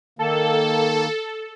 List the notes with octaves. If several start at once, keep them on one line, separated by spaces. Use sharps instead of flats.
D#3 A#3 A4